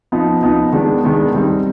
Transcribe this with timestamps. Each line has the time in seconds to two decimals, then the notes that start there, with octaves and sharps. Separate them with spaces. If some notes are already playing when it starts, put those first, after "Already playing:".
0.12 F3 B3 D#4
0.43 F3 B3 D#4
0.72 D#3 G#3 B3 D4
1.04 D#3 G#3 B3 D4
1.34 D#3 G3 C4 D#4